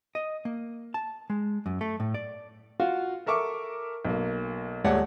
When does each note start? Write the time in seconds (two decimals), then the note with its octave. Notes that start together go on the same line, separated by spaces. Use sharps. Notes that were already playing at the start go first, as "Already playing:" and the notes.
0.15 D#5
0.45 A#3
0.94 A5
1.30 G#3
1.66 F#2
1.81 A3
2.00 A2
2.14 D5
2.80 F4 F#4 F5
3.26 A4 A#4 E5 C#6 D6
4.05 B1 A#3
4.84 D#1 G#3 A3 C#5 D5 F#5